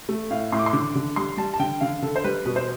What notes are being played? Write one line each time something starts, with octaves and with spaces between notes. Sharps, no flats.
A3
A2 F5
A2 C6
D6
C6
D3 D6
D3
G3 C6
G3 A5
A5
D3 G5
D3 F5
D3 A4
C5
G3 B4
B2 B4
C5